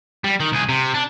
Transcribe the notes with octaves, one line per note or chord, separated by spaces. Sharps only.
G3
D#3
C2 G#4
C3
D4